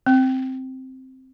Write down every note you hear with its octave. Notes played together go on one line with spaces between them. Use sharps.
C4